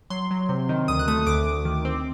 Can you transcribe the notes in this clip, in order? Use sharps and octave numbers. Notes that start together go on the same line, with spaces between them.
F#3 C6
F#3
C3
D#3
D2 D#6
F#6
A3 D#6
D2 D6
D2
D#3
C4